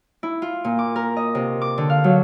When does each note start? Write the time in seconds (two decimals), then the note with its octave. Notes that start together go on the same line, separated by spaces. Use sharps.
0.23 E4
0.42 F4
0.65 A#2
0.79 D6
0.96 A#4
1.16 D#5
1.35 C3
1.62 D6
1.78 D3
1.90 F5
2.04 F#3